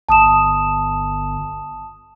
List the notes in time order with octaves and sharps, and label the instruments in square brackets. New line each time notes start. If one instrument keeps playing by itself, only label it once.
[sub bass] G1 [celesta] A5 D#6 E7